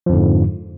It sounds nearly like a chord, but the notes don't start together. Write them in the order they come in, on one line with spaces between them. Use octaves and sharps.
F3 F2 D3 G#2